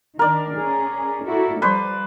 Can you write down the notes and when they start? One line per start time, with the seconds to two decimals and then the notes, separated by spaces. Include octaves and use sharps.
0.19 D#3 D4 A#4 D5
0.56 C#4 G#4
1.25 E4 F#4 A4
1.62 F3 G3 B4 C5 D5